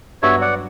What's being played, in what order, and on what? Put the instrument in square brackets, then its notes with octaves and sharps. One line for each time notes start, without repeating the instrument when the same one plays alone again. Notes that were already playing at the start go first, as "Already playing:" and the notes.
[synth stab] G2 F#3 B3 F#4 [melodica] C#5 E5
[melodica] D5 F#5